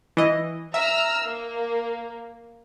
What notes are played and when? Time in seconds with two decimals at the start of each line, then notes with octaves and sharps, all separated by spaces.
0.17 E3 D#5
0.74 E5 A#5 E6 F6
1.25 A#3